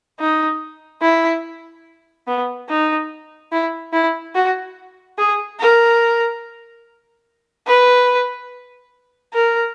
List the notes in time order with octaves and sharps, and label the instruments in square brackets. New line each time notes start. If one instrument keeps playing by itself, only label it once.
[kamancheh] D#4
E4
B3
D#4
E4
E4
F#4
G#4
A#4
B4
A#4